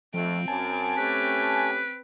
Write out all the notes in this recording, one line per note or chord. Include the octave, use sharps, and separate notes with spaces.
F2 F3 A3 C4 D7
F#2 G#5 A5
A3 C#4 G4 B4